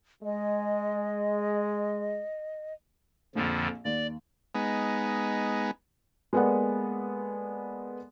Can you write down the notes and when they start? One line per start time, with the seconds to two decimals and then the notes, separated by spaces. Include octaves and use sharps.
0.23 G#3 D#5
3.35 A#1 F2 D3 F3
3.85 D#2 D5
4.55 G#3 B3 D#4
6.33 G#3 A#3 B3 A4 D5 F#5